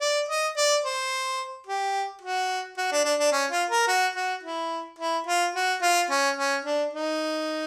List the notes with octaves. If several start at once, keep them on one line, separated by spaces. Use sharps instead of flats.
D5
D#5
D5
C5
G4
F#4
F#4
D4
D4
D4
C#4
F4
A#4
F#4
F#4
E4
E4
F4
F#4
F4
C#4
C#4
D4
D#4